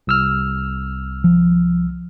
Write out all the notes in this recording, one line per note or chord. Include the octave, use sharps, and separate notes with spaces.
C2 E6 F6
F3